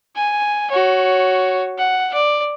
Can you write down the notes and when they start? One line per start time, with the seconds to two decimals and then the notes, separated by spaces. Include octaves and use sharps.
0.16 G#5
0.70 F#4 C#5
1.78 F#5
2.14 D5